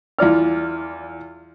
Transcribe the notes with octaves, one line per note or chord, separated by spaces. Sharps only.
E2 F4 D5 F6